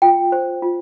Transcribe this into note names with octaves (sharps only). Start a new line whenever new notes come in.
F4 G5
C5
F4